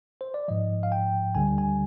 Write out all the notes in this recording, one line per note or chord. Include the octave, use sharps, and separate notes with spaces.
C5
D5
G#2 F3 D#5
F5
G5
D2 D3 G3 G#5
G#5